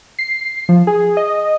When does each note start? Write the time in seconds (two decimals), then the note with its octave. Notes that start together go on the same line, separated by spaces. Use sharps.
0.19 C7
0.69 F3
0.87 G#4
1.17 D#5